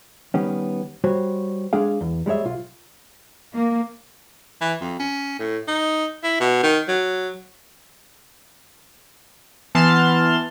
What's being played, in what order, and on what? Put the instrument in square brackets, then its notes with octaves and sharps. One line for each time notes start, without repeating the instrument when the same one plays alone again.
[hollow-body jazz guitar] D#3 G3 B3 C#4
G3 F#4 C5 C#5
G#3 D4 G#4 F5
E2
G3 G#3 G4 C#5 E5
B1 F4
[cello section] A#3
[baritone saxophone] E3
F2
C#4
A2
D#4
E4
B2
D#3
F#3
[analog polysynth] E3 B3 A5 C6 F6